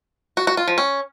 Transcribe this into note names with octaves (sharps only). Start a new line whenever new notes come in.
F#4
F#4
F4
F3
C#4